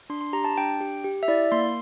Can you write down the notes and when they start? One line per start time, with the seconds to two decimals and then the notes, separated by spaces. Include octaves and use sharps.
0.10 D4 C6
0.21 C6
0.33 G4 A#5
0.44 A5
0.57 D4 G5
0.81 G4
1.04 G4
1.23 E5
1.28 E4 D5
1.52 A#3 C6